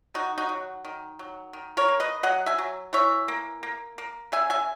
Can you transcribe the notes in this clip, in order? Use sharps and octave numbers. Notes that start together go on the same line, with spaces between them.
D#3 D#4 F#4
D#4 F#4
F#3
D#3
F#3
D#3
A#4 C#5
A#3
B4 D#5
F#3 D#5 F#5
E5 G#5
F#3
E3 C#5 E5
A#3
A#3
A#3
C#3 E5 G#5
E5 G#5